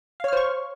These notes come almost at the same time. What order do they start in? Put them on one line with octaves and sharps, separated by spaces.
F5 C#5 F6 C5 C#6